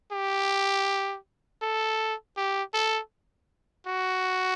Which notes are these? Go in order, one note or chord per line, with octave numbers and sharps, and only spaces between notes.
G4
A4
G4
A4
F#4